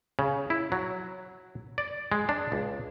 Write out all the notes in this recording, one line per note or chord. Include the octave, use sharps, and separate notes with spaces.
C#3
E4
F#3
D5
G#3
D4
C#2